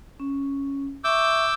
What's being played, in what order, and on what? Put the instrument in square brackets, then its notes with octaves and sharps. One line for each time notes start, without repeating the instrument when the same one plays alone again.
[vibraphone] C#4
[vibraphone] E5 C#6 [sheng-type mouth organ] D6 E6 G6